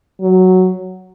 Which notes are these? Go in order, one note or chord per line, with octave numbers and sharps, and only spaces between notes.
F#3